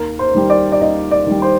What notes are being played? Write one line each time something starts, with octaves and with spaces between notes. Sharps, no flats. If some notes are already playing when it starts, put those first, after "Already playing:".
Already playing: D#2 A#4
C5
D#3 G3
D5
D5
D#2 D#5
D5
D#3 G3
C5